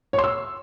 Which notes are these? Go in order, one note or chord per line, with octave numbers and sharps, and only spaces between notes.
C#5
C6
E6